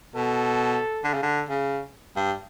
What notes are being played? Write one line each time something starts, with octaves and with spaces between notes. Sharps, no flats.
B2 A4
D3
C#3
D3
C#3
G2